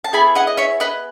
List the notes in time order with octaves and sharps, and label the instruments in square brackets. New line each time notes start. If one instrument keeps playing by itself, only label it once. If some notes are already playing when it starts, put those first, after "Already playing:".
[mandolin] A5
B3 E4 G#4 G#5 B5
D#5 F#5
D#5
C#5 E5
B4 D#5